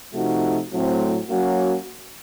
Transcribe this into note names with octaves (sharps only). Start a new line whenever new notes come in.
C3 F3 A3 D#4 F#4
A2 F#3 A3 C4
F#3 A#3 C#4 F#4